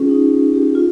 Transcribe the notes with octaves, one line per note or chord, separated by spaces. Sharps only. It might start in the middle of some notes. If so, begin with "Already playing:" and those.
Already playing: C#4 F4 G#4
D#4
G4
F4